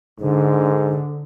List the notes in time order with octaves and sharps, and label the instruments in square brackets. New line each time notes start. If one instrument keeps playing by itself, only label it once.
[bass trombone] G#2 [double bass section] D3